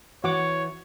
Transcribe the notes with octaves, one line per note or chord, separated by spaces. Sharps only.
E3 B3 F#4 C#5 F#5 D6